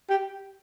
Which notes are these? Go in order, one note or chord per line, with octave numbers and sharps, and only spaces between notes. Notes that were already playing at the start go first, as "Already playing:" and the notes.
G4